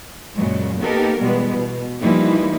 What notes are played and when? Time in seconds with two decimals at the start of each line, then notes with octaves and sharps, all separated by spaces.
0.35 F#2 A#2 C#3 F#3 G#3
0.79 A#3 B3 D#4 G4 A4 A#4
1.21 B2 E3 G3 G#3 B3
1.57 B2
2.01 E3 F3 G3 A#3 D#4 E4